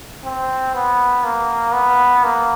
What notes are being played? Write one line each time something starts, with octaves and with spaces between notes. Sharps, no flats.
C4
B3
A#3
B3
A#3